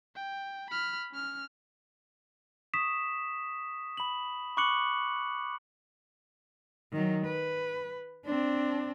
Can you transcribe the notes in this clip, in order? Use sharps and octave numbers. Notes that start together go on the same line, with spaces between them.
G5
B5 F6
C#4 F6
C#6 D#6 B6 E7
B5 F#7
B5 C#6 D6 F#6 C#7 F#7
D#3 F#3
B4
C4 D4